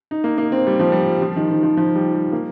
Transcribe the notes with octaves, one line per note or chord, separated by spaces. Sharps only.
D#4
A#3
A#3
C4
G3
F3
G3
F3
D#3
D#3
F3
F3
G3
G3
A#3